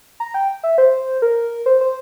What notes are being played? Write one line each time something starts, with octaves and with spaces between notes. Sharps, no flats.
A#5
G5
E5
C5
A#4
C5
C5